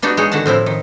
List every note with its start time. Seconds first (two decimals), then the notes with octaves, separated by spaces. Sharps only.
0.02 B3 D4 D#4 F#4 G4
0.17 G#3 D#4 C#5
0.32 D3 D#3 F#4 F#5 A5
0.46 A2 F3 C4 E4
0.66 D#3